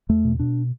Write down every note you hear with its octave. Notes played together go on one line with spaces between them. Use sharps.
E2 A3
B2
B2 D4